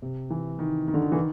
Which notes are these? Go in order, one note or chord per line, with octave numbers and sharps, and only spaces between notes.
C3
E3
D#3
D#3
D3
D#3
E3
D#3